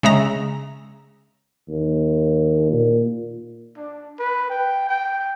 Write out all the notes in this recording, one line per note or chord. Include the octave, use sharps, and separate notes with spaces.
C#3 G#3 E5 A#5
D#2
A#2
D4
B4
G5
G5